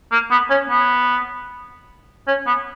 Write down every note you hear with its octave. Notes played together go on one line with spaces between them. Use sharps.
A#3
B3
C#4
B3
C#4
B3